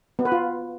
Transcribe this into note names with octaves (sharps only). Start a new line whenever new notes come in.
B3
B4
F4